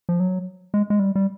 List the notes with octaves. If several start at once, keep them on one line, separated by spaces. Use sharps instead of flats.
F3
F#3
G#3
G#3
G3
G3